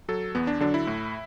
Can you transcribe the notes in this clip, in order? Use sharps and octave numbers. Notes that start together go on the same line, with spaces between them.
F#3 A4
E2 B3
D4
D3 F#3 D4
E4
A2